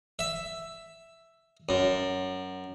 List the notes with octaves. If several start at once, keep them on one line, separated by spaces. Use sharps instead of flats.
E5
F#2